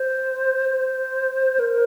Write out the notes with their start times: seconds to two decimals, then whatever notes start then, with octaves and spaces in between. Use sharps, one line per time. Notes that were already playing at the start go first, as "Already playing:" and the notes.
Already playing: C5
0.71 C5
1.59 A#4